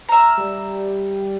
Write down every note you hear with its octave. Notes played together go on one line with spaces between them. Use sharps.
E5 A#5 F6
G3